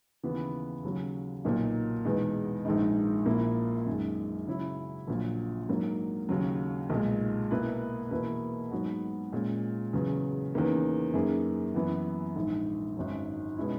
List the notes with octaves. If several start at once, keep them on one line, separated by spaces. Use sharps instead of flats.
D#2 C#3 E3 B3
D#2 C#3 F#3
B1 A#2 F#3 A#3 D#4
E2 B2 G#3 D#4
A#1 G#2 D#3 G#3 D#4
A#1 A#2 A#3 E4
F#2 D#3 G#3
C#3 F#3 C#4 E4
A#1 A#2 F#3
G#2 F#3 A#3
D#2 C#3 F#3
B1 A#2 G#3
B2 A#3 E4 B4
E2 B2 A#3 E4
G#2 F#3 B3 F#4
A#2 G#3 C#4
E2 C#3 F#3 C#4 G#4
E2 D#3 A#3 C#4
F#2 D#3 A#3 C#4 G#4
F#2 E3 B3
A#1 G#2 D#3
G#1 F#2 D#3 F#3 C#4
B2 G#3 C#4 E4